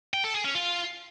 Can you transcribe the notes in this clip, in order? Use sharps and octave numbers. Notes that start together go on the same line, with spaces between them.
G5
A4
G#4
C#4
F4